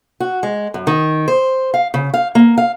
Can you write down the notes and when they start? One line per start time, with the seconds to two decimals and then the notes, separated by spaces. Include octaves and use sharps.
0.20 F#4
0.43 G#3
0.74 F#2
0.87 D#3
1.28 C5
1.74 F5
1.94 C#3
2.14 F5
2.35 A#3
2.58 F5